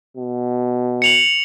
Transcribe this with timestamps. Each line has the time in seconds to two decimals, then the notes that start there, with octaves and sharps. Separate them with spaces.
0.17 B2
1.02 C#7 F7 F#7